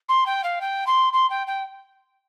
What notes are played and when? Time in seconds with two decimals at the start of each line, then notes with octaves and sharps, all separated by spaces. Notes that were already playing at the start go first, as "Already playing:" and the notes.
0.09 C6
0.26 G5
0.44 F5
0.61 G5
0.87 C6
1.13 C6
1.30 G5
1.47 G5